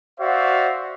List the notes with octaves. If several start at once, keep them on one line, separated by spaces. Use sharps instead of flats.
F#4 C5 D5 E5 F5